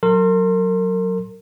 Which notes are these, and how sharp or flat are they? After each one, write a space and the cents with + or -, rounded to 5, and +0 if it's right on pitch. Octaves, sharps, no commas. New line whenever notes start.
F#3 +0 A#4 -35 C6 +20